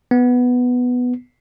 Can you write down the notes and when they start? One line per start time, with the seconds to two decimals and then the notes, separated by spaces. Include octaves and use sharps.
0.11 B3